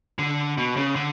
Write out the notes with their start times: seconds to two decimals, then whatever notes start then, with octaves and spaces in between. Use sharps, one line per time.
0.19 D3
0.57 B2
0.77 C#3
0.96 D3